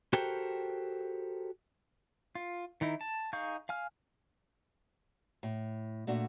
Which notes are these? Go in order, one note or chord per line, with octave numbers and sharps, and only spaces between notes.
F#4 G4 A4 A#4 C5 G5
F4
D#3 D#4 E4
A5
D#4 G#4 F5 C#6 G6
F5 G#5 F6
A2
A#2 A3 D4 F#4